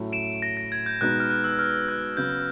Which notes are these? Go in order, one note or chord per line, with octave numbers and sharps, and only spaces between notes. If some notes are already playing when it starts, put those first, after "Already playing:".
Already playing: A2 F#3 A3 C#4 E4
D7 E7
A#6
A#6
G#6
G6
B2 G#3 B3 D#4 F#6
F6
F#6
E6
F6
F#6
C#3 F#3 B3 G6